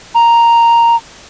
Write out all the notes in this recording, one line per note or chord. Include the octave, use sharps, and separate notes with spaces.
A#5